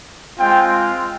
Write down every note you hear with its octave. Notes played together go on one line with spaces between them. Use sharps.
G#3 C4 F4 G5